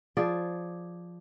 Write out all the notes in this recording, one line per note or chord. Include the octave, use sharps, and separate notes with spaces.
F3 G#4 D5